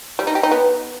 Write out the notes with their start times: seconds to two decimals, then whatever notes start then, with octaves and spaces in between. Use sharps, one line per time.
0.19 G3
0.27 D#4
0.35 G4
0.43 D#4
0.52 B3